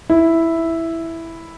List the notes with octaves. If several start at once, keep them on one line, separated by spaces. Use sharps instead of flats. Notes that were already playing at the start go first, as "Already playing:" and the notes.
E4